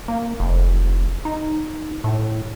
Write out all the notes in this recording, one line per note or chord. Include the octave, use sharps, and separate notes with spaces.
A#3
F1
D#4
A2